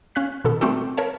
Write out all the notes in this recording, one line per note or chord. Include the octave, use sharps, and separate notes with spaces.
C#4 F5 F#6 B6
B2 D#3 A4
G3 A3 C4 F#4 G4 A4
A#4 B4 C#5 A5